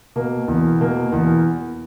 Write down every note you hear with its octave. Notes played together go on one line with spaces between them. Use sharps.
B2 A#3
E2
B2 A#3
E2